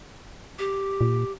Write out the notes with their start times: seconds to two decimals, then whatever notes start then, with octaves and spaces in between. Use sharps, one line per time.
0.59 G4
1.01 A#2